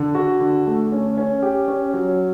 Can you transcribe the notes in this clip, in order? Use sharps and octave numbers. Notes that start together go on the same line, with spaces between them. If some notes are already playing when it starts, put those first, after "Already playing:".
Already playing: D3
F#4
D3
A3
C#4
C#4
G4
C#4
F#3